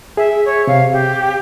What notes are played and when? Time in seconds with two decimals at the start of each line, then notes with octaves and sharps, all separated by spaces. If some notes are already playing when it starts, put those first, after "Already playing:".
0.17 G#4 E5
0.45 C#5
0.67 C3 F5
0.92 G4